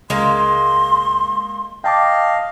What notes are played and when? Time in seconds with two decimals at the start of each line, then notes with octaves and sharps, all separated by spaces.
0.10 C#2 G#3 A#3 C6
1.84 D#5 F5 G5 A5 D6